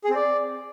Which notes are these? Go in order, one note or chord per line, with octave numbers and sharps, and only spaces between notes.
G#4
C4
D5